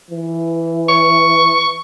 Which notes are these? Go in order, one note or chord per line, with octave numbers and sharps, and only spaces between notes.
E3
C#6